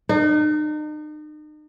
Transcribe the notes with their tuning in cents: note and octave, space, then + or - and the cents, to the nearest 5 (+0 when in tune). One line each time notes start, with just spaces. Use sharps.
D#4 -40